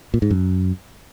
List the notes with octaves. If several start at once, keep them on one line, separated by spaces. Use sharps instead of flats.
A#2
G#2
F#2